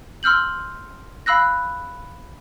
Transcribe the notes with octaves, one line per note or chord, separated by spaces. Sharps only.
C6 E6 F6 G6 F#7
F5 B5 E6 F#6 A#6